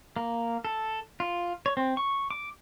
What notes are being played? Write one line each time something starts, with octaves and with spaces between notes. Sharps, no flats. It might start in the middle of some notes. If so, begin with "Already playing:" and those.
A#3
A4
F4
C#5
C4
C#6
D6